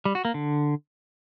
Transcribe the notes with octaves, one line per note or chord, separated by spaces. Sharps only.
G3
F#4
A#3
D3